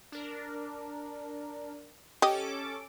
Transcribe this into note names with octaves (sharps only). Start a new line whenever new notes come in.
D4 A#4
C#4 G4 A4 D#5 D6